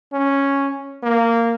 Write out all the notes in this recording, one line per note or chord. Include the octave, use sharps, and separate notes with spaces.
C#4
A#3